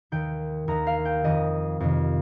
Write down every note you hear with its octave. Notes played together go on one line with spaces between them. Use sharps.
D#2 D#3 G5
D#2 D#3 A#5
F5
G5
F2 D#3 D#5
F2 C3 D#3